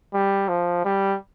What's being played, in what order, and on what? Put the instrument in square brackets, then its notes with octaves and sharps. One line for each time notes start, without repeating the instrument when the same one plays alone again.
[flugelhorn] G3
F3
G3